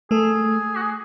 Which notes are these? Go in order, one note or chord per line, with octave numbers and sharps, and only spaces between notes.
A3 G#4 A4
F#4
G#4